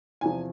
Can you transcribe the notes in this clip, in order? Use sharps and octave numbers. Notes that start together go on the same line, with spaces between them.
E2 C3 F3 G#5